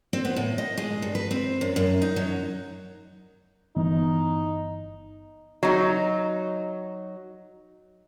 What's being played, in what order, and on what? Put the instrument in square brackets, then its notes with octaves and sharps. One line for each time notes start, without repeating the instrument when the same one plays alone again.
[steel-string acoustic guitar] C4
B3
A2
D#5
G#3
G2
B4
C4
F#2
F#2
D#4
F#3
[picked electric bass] G1 E3 B3 [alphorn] D#4
[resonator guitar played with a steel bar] F#3 D#4